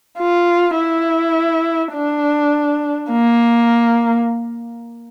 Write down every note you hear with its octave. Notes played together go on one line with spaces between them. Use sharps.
F4
E4
D4
A#3